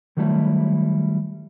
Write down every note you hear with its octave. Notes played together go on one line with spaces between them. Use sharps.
D#3 F#3 G3 A3 E4